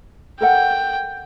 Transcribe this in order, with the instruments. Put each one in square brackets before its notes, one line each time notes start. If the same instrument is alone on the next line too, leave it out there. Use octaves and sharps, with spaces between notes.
[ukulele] A4 A#4 F#5 [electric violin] G5